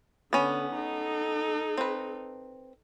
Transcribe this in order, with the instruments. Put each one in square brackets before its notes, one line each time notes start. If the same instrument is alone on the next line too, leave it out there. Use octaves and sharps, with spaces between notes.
[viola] D3 [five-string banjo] B3 C#4
[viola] D#4 A4
[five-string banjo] C4 B4